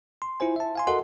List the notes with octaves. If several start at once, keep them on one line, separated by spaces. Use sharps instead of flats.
C6
E4 F4 C5 G#5
E5 A5
F5 G#5 C6
F#4 A4 A#4 D#5 F#5 C6